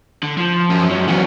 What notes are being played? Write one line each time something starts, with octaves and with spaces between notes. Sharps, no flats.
D3
F3
F#2
G#2 C#4
E3 F#3 B3 C#4